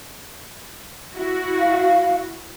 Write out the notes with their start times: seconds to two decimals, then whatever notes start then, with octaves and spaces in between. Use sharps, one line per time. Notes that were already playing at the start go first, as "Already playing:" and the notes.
1.13 E4 F#4
1.59 F5